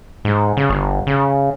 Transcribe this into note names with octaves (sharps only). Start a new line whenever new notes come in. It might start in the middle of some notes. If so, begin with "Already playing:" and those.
G#2
C#3
G1
C#3